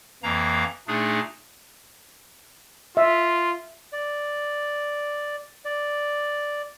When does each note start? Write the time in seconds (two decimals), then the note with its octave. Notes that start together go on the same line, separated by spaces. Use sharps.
0.23 F2 E3 A#3 F5 A#5
0.87 A#2 A3 D4 D#4 G#4
2.97 F4 E5
3.93 D5
5.65 D5